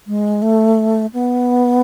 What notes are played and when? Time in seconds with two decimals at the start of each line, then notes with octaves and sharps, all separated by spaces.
0.07 G#3
0.42 A3
1.14 B3